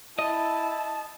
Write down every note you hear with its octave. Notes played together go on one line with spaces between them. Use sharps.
E4 D#5 A5